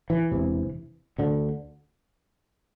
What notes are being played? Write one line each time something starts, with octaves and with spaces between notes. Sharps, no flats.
E3
E1 E2 C3
D2 D3